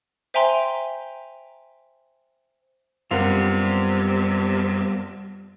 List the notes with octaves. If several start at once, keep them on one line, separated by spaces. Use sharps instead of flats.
C5 E5 G5 G#5 A#5 C6
F#2 C3 G3 B3 F4 A#4 F#5